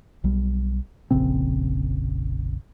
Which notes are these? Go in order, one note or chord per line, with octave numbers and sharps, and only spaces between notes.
B1 G3
F1 A#1 C#3 C4